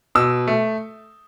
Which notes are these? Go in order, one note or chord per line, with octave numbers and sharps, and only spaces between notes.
B2 E6
A3